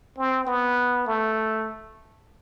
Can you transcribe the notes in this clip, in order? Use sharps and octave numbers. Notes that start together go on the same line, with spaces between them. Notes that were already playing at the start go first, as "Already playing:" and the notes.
C4
B3
A3